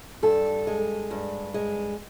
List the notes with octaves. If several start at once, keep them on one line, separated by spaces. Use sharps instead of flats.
G2 A4
G#3
G2
G#3